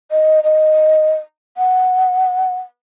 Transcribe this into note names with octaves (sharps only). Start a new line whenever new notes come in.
D#5
D#5
F#5